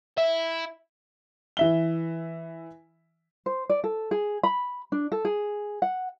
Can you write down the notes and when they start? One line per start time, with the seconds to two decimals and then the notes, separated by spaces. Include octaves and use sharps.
0.18 E4 E5
1.57 E3 E5 G7
3.46 C5
3.69 D5
3.84 A4
4.11 G#4
4.43 B5
4.92 D4
5.12 A4
5.25 G#4
5.82 F#5